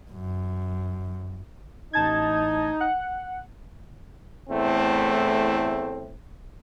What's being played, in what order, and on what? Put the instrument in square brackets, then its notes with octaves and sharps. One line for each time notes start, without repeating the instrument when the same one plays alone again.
[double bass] F#2
[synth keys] A1 A5 G#6 [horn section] D#4
[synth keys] F#5
[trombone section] E2 A2 A3 C4